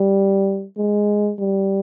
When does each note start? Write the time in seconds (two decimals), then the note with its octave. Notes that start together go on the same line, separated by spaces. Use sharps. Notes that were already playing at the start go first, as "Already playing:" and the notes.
Already playing: G3
0.78 G#3
1.38 G3